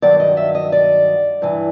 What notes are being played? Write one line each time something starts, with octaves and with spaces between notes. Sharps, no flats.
G2 D#3 F#3 D5
D#5
E5
D#5
D5
G2 E3